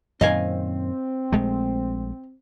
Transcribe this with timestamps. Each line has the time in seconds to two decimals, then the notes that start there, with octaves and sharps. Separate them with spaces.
0.21 F#2 A#2 D#3 C4 D#5 F5 G#5
1.33 A#1 G#3 A3